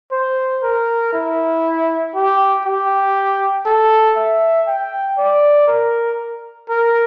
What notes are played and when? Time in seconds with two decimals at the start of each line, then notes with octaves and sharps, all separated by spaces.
0.12 C5
0.63 A#4
1.13 E4
2.15 G4
2.65 G4
3.66 A4
4.16 E5
4.67 G5
5.18 D5
5.67 A#4
6.69 A#4